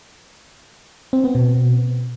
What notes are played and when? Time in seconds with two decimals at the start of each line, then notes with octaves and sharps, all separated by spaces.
1.13 C4
1.24 B3
1.35 B2